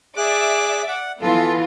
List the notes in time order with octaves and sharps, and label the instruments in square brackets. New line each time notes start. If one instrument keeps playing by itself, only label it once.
[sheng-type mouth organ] G#4 F#6 [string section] D5 E5 D6
[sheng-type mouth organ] F#5
[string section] E3 B3 F4 [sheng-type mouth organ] A4